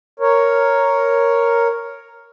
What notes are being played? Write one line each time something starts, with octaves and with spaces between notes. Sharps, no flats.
A#4 C#5